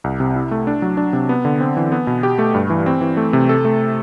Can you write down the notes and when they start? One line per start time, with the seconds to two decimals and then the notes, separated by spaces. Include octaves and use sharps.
0.04 C2
0.20 C3
0.35 E4
0.51 A3
0.67 D4
0.82 F#3
0.97 D4
1.13 C3
1.29 B3
1.45 D3
1.60 C4
1.77 E3
1.92 B3
2.07 B2
2.23 G4
2.39 A3
2.55 G2
2.70 E3
2.86 C4
3.01 E3
3.17 A3
3.33 C3
3.49 A4
3.65 A3